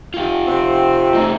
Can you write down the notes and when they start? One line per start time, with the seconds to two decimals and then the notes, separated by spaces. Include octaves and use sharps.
0.14 F4 G4
0.47 C3 C4
1.14 F#2 A3 D#4